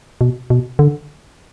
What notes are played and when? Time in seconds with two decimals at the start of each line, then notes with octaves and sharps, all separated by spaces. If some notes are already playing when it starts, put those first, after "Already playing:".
0.21 B2
0.50 B2
0.79 D3